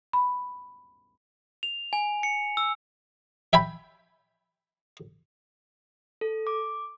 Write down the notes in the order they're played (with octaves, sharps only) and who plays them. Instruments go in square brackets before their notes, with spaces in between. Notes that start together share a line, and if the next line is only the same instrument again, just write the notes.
[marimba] B5
[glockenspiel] F7
G#5
C#7
E6
[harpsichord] E5 G5 G#5 B5
[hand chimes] A4
D6